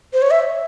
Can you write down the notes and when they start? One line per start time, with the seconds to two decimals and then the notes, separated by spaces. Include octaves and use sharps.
0.13 C5
0.22 C#5
0.31 E5